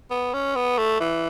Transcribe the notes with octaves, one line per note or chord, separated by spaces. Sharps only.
B3
C#4
B3
A3
E3